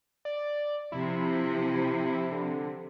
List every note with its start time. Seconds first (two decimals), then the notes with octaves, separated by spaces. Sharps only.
0.25 D5
0.92 C3 F3 E4
2.32 D3